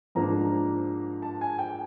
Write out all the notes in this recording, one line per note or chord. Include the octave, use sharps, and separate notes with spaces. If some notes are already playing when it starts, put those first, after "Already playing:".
G#2 F3 A#3 D4 A#5
A5
G#5
G5